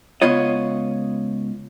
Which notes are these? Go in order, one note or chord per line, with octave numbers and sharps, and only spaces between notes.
C#2 B3 F4 C#5 D#5